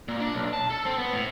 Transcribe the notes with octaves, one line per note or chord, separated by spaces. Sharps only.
A#2
D4
B1
A5
A4
C4
B3
A2